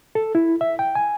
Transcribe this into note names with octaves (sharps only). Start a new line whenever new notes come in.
A4
E4
E5
G5
G#5